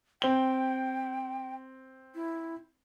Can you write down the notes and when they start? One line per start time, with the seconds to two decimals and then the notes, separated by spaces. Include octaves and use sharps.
0.22 C4 G5 G7
2.15 E4